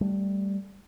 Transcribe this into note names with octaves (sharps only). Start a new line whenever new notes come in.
G3 A3